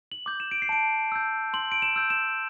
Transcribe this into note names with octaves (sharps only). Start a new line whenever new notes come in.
F#7
D6 G6
E7
D7
C7
A5 D7
E6 G6
C6 F#7
D7
E7
E6 G6
E7